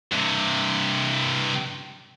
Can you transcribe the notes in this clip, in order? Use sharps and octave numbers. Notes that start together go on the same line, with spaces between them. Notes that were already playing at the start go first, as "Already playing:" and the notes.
G2 C3